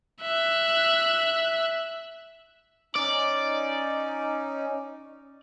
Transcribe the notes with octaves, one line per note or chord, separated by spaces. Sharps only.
E5 F#6
C#4 D#4 D5